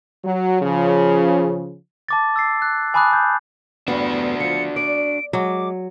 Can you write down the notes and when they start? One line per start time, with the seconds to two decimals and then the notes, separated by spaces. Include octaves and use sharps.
0.25 F#3
0.62 C#3 F3
2.09 A5 D6 A6
2.36 E6 A6 C7
2.62 F#6
2.94 G#5 A5 B5 D6 D#6 F#6
3.11 F#6 G6
3.88 E2 G2 B3 D4 F#4
4.40 F3 C#7
4.76 D5 D7
5.33 F#3 G#3 D6